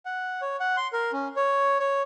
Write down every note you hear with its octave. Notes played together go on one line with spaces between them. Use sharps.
F#5
C#5
F#5
C6
A#4
C#4
C#5
C#5